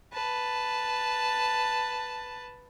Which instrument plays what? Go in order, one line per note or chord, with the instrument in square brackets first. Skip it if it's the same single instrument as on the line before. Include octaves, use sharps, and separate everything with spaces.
[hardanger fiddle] B4 A5